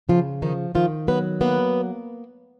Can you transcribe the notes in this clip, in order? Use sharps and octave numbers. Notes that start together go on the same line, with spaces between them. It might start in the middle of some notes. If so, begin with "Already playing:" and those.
C#3 F3 F4
D#3 F3 D#4
D#3 F3 F4
F#3 B3 B4
A#3 B3 B4